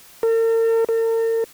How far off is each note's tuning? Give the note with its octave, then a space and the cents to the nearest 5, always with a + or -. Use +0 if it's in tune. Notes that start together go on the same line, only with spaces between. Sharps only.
A#4 -45
A#4 -45